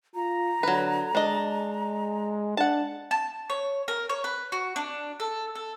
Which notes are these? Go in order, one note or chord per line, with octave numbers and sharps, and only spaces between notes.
F4 A#5
D3 F#3 B4
G#3 D4 D#5
D4 F#5 A5
A5
C#5
A#4
C#5
B4
F#4
D4
A4
A4